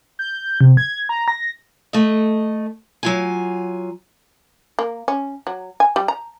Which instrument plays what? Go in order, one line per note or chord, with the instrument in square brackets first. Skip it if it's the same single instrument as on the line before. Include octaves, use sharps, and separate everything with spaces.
[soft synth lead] G6
C3
G#6
A#5
A#6
[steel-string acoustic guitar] A3 D#5
F#3 F4 G#5
[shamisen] A#3
C#4
F#3
G#5
G3
A#5